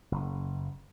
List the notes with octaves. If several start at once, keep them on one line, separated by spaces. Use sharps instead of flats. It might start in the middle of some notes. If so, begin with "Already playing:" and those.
F#1